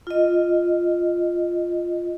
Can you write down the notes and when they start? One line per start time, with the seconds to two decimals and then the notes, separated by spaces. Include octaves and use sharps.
0.07 F4 D#5